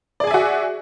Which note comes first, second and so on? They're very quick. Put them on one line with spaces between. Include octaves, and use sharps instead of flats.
D5 G#4 G#5 E5 F#4